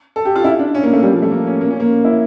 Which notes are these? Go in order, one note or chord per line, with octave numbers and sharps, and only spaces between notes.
A4
G4
F4
E4
D4
C#4
A#3
A3
G3
F3
A3
A#3
C#4
A#3
C#4
A#3
E4